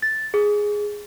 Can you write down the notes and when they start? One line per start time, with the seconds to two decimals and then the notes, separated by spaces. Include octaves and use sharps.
0.02 A6
0.34 G#4